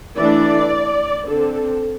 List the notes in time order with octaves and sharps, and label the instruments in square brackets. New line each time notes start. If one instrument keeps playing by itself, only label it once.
[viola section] E3 A3 D4 D5
D3 C4 A4